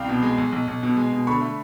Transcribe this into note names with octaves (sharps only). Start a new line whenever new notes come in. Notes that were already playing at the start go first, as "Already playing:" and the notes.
Already playing: C2 F5 G5
B2
G#3
B1
B1
B1
B2
G#3
B2
D3 B5 C#6
A3